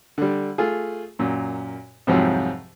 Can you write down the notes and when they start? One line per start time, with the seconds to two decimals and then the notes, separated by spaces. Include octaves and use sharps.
0.18 D3 G3
0.58 A3 F4 G#4
1.19 F#2 A#2
2.07 C2 F2 G#2 C3 F3 F#3